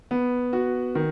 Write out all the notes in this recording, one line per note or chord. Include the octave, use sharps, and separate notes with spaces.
B3
F#4
D#3